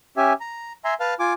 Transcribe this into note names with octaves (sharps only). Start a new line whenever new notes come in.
C#4 G4 E5 G#5
A#5
E5 G#5 A#5 C6
B4 F5 A5 F6
F4 G#5 D6